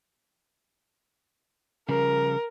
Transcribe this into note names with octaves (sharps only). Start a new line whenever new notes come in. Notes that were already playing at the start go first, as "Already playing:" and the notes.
C#3 F3 G3 A#4